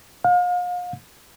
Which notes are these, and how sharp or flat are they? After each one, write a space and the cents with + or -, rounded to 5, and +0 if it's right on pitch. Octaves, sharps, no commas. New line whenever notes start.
F5 +40